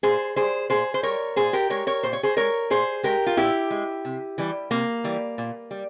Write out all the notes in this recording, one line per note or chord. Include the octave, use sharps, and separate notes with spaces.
A#2 G#4 C5
G3 G#4 C5
A#2 G#4 C5
C5
G3 A#4 C#5
A#2 G#4 C5
G4 A#4
G#3 A#4 C#5
A#4 C#5
A#2 C5
C#5
G#4 C5
G#3 A#4 C#5
A#2 G#4 C5
G#3 G4 A#4
F4
A#2 E4 G4
G#3
C3
E3 G3
C3 A#3
E3 G3
A#2
G3